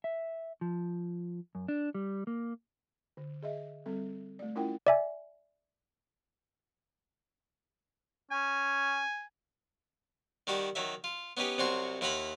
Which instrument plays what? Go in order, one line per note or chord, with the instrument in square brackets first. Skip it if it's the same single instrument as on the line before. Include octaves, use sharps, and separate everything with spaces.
[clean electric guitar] E5
F3
F#2
D4
G3
A#3
[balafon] D3
G#4 D#5 E5
G3 C4 A4
A3 D5
C#4 E4 F4 A#4 F#5 G5
[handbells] D5 E5 G#5
[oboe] C#4 [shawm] G#5
[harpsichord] D#3 G3 F#4 A5
D#3 F#3 E5
F4
B3 C#4 D#4 G4 B4
C2 C3 F#3 F#4 C6 C#6
D#2 E4 F4 F#5 A#5 B5